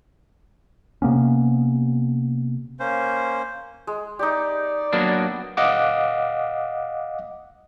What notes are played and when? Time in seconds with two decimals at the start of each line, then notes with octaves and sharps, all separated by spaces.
1.02 C3 A#3 B3 C#4
2.80 A#3 C#4 C5
3.87 G#3
4.19 D#4 G4 D5
4.93 F#3 A#3 B3 D4
5.57 D#5 F5 F#5 D6